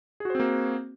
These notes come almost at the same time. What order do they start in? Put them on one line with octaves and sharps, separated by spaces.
G#4 F#4 C5 C4 A#3